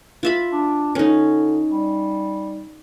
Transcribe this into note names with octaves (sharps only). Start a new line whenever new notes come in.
F4 E5 B5
D4
D3 C#4 D#4
G3